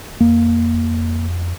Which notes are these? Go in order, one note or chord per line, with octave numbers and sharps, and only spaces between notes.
F2 A#3